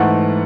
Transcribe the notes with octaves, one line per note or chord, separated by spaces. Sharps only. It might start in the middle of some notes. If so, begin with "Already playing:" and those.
Already playing: G#2 E3 A3 F#5